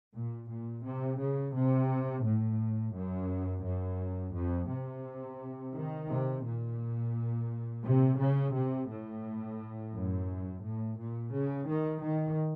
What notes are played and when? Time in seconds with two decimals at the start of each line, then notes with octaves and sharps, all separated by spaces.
0.15 A#2
0.50 A#2
0.85 C3
1.20 C#3
1.55 C3
2.24 A2
2.95 F#2
3.64 F#2
4.35 F2
4.70 C3
5.75 D#3
6.09 C3
6.44 A#2
7.84 C3
8.19 C#3
8.54 C3
8.89 A2
9.94 F#2
10.63 A2
10.98 A#2
11.33 C#3
11.68 D#3
12.03 D#3